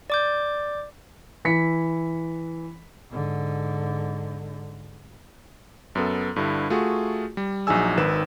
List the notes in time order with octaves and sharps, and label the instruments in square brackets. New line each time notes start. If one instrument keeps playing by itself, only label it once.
[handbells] D5 D6 G6
[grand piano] E3 B6 C#7
[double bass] G#2 D3
[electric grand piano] F#2 B3 A4
G2 D3 E4
A3 F4 F#4 G#4
G3
A#1 F#3 D#4 G#4 G#5 E6
G#1 D#3 B4 E7